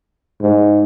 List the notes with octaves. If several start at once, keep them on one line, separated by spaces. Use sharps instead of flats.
G#2